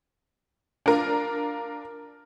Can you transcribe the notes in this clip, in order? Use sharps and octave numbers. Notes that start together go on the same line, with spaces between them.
D4 F4 A#4